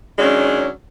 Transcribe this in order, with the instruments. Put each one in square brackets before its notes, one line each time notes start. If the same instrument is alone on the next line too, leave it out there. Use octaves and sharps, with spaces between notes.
[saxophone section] D#3 F#3 G#3 C#4 D4